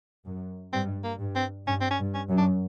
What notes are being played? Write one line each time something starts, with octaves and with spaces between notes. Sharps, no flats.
F#2
G2 C4
A#3
G2
C4
G2 C#4
C4
C#4
G2
C#4
F#2
D4